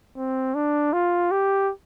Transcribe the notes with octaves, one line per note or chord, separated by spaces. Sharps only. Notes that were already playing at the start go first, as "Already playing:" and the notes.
C4
D4
F4
G4